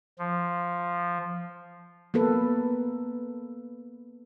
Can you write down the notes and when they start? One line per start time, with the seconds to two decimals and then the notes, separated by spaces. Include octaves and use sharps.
0.18 F3
2.14 A#3 B3 A4 B4